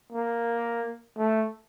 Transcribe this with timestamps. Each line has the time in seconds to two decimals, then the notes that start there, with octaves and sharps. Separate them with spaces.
0.12 A#3
1.18 A3